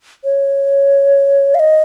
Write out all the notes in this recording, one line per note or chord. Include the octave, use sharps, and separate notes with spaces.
C#5
F5
D#5